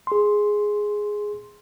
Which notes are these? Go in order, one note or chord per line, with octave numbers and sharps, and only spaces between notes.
G#4 C6